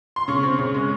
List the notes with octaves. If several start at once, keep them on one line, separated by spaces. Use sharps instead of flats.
C6
C#3 C#6
C4
C#3
G#3